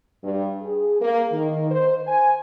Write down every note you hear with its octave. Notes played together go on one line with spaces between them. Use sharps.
G2
G#4
A#3
D#3
C5
G#5